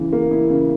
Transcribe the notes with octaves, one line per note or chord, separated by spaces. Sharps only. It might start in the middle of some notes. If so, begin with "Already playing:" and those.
Already playing: C#3 E3
A#3
E4
C#3